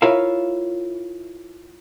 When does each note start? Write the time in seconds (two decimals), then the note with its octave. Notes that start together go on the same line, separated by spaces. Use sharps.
0.02 E4 F4 A#4 C#5 E5 F5